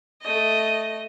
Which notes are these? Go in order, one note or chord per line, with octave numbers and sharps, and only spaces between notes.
A3 D#5